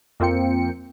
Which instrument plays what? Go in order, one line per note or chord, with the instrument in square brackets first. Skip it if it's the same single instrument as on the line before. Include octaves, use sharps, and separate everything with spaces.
[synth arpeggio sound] F2 A#3 C4 F4 G5 C#7